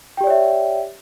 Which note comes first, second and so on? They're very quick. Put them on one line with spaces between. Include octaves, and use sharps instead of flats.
G5 G4 D5 C#5 E5